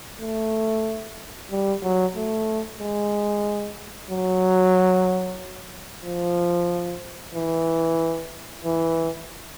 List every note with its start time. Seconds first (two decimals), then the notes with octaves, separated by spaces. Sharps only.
0.21 A3
1.51 G3
1.83 F#3
2.16 A3
2.81 G#3
4.10 F#3
6.05 F3
7.34 E3
8.64 E3